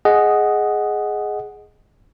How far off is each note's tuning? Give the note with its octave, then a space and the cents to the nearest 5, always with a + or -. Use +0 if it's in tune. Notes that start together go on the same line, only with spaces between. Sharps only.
G#4 +5 D#5 +0 F#5 +0